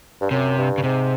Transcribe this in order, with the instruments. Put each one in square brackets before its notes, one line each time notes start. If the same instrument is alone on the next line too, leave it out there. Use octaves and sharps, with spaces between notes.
[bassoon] G2
[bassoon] F#2 [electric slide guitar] C3
[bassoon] G2
[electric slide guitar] C#3
[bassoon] G#2 [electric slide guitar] C3